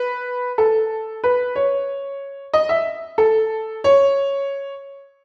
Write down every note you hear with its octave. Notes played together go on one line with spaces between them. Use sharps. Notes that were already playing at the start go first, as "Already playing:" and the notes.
Already playing: B4
A4
B4
C#5
D#5
E5
A4
C#5